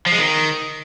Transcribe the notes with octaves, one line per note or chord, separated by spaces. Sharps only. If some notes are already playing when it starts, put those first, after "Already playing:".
F3
G#3
D#3